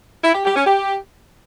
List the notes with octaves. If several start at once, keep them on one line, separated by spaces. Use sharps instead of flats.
E4
G4
G4
C#4
G4